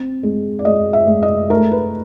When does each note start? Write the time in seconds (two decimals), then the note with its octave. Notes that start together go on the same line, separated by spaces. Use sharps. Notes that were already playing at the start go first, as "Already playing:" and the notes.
Already playing: C4
0.23 G#3
0.59 D5
0.65 G#3 D#5
0.93 E5
1.07 G#3
1.23 D#5
1.50 A3 A#4
1.72 B4